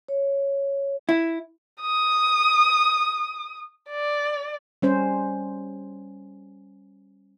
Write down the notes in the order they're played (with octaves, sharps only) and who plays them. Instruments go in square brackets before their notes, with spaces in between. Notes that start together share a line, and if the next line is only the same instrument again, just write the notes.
[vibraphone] C#5
[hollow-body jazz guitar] E4
[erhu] D#6
D5
[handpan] G3 C#4 C5